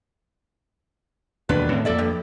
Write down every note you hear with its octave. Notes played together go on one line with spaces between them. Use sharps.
E1 D#2 D4 B4
A2 D#3 C4
F2 A#3 A4 D5 E5
G2